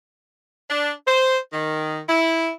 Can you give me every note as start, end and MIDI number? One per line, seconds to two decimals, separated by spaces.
0.70 0.92 62
1.07 1.37 72
1.53 2.01 51
2.08 2.50 64